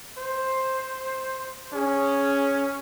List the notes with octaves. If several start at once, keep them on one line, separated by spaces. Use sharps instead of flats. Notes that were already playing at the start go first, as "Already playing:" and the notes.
C5
C#4 G#4